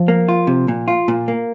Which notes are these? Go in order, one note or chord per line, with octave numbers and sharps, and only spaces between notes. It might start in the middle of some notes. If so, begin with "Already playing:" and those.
Already playing: F3
A#3
F4
C3
A#2
F4
A#2
A#3